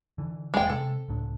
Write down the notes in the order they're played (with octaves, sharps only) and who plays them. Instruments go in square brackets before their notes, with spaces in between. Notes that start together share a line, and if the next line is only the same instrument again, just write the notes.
[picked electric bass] D3 E3
[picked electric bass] E1 C2 A#3 [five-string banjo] G#3 G5
[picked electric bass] C3 [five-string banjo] A4
[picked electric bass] C#2 A2 D4